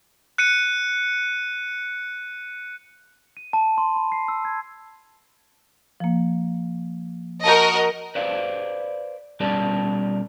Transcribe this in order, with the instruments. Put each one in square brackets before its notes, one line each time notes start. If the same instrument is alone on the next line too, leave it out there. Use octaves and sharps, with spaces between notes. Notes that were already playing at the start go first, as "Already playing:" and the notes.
[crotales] F#6 C#7 D#7
[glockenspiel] D#7
A5
C6
B5
C7
E6
G#6
[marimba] F3 A#3
[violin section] F#4 A#4 D#5 [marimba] A5 G6
[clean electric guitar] B4 C5 D5 F5
B2 G3 C#4 A#4 D5 A5